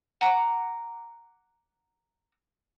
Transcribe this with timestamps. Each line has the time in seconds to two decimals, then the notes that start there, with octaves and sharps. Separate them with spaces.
0.21 F#5 A#5 D6